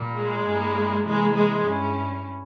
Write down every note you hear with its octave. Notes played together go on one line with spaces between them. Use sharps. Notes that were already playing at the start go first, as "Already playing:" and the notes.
Already playing: A#2 G3 A#3
G#3
G2 G3 A#3 E4
C3 E3 G#3 A#3 E4
G#3
G2 G3 C#4 E4